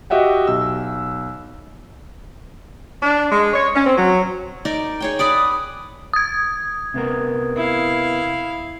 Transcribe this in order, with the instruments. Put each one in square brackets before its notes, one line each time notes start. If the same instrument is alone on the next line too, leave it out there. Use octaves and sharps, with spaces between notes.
[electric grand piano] F#4 G4 D#5 E5 F#5 G5
B1 E6
[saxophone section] D4
G#3
C#5
C#4
C4
F#3
[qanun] D#4 A#4 D5
G#4 C#5 G5
[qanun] B4 D5 D6 [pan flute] D#6
[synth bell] D#6 G#6
[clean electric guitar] C3 B3 A#4
[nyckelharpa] E4 F5